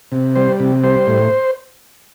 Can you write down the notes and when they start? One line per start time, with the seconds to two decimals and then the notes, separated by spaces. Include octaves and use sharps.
0.12 C3
0.35 G3 C5
0.60 C3
0.84 G3 C5
1.07 A2